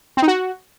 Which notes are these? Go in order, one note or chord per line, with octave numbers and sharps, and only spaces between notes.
C4
D#4
F#4